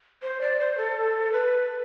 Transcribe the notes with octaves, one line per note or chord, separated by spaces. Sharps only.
C5
D5
C5
A4
B4